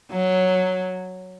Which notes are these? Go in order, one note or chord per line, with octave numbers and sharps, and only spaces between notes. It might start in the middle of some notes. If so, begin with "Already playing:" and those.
F#3